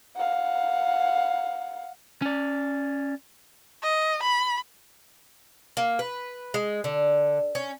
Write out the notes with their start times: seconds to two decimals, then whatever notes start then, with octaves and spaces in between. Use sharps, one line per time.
0.16 F5 F#5
2.22 C#4 D5
3.83 D#5
4.22 B5
5.77 A#3
5.99 B4
6.54 G#3
6.84 D3
7.55 C#4